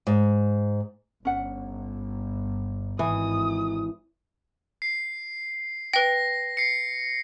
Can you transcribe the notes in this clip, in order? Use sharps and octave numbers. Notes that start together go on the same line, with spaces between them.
G#2
G1 C#4 F#5
G#1 G#2 E3 D#6
C7
B4 G5 A#6
C7 C#7